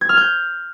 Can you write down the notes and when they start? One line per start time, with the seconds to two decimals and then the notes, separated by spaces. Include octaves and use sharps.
0.01 G#6
0.09 F6
0.17 G6